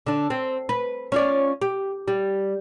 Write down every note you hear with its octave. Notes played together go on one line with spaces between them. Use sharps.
D3 D4
C4
B4
C#4 F4 D5
G4
G3